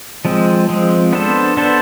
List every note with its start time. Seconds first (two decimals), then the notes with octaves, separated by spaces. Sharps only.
0.25 F3 G#3 C4
0.69 F3 G#3 C4
1.13 B3 D4 A4 C5
1.57 B3 D4 A4 C5